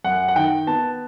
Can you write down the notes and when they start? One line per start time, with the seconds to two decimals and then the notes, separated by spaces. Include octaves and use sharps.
0.05 F#2 F#5
0.28 F#5
0.35 D#3 G5
0.67 B3 A5